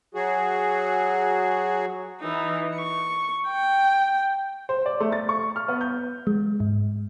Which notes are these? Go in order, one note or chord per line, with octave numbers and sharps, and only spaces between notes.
F#3 F#4 G#4
E3 D#4
C#6
G5
C5
D5
A3
A6
C#6
F6
B3
G6
G#3
G#2